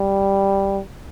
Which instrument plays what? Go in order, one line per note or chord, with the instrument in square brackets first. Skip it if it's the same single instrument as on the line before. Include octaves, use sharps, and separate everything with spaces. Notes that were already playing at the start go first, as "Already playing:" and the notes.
Already playing: [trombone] G3